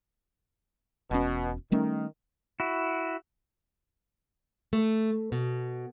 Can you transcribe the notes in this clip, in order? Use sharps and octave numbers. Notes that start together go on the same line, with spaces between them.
E1 B2 C#4
D#3 G3 A3 C#4
E4 F#4
A3
B2